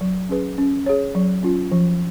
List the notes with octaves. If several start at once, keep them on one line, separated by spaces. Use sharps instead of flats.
F#3
C#4 G#4 B4
C#4
G#4 C#5
F#3
C#4 F4
F3